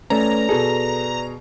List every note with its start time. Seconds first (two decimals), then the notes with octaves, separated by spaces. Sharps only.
0.10 A3 C#4 B4 D5 A#5
0.49 B2 G#4 A4